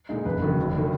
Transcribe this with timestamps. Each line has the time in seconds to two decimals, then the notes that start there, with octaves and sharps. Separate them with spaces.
0.09 A#2 G#3 D#4
0.25 F#1 B4
0.42 F#2 D#3
0.58 F1
0.78 D#3